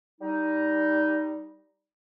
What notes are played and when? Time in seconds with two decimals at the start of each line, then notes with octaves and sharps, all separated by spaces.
0.21 G3 D#4